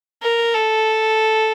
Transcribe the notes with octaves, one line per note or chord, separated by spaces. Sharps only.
A#4
A4